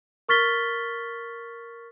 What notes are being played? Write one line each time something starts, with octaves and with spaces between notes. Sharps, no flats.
A#4 C#6 F6 A6 B6 G7